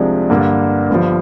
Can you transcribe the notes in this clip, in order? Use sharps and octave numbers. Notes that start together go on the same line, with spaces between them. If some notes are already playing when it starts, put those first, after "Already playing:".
Already playing: C2 C3 F3 G#3 D4
G2 D3 G3 A#3
G1 G2 F3